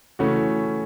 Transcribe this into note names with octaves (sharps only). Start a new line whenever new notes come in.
C#3 E3 A3 C#4 F#4